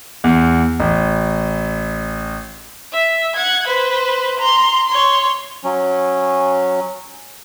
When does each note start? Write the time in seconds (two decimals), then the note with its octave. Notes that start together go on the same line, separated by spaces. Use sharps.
0.24 E2
0.80 A1
2.93 E5
3.35 F#5 G#6
3.67 B4 C5
4.39 A#5 C6
4.88 C#5 C6
5.64 F#3 C#4